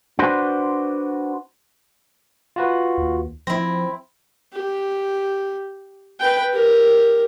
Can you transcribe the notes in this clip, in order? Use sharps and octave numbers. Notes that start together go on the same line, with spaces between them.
D4 F#4 B4 C5
F4 F#4 B4
D#2
F3 C4 E4 A#6
G4
B4 G5
G4 A#4